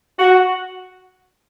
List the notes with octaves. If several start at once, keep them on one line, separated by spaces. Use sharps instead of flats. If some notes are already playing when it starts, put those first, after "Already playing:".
F#4